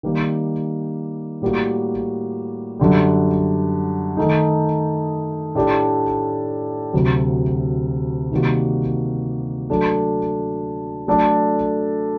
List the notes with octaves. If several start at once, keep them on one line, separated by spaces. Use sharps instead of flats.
D#3 G3 A#3
A2 G3 A#3 F#4
F#2 D3 G3
D#3 A3 D#4
A2 A3 D4 G4 D5
D2 C3 F#3
C3 D#3 G3 A#3 F#4
F#3 A3 D4 A4
F#3 A3 D4 A4 D5